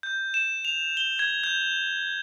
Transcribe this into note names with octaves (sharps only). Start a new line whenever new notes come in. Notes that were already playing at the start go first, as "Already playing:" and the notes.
G6
E7
F7
G7
G#6
G6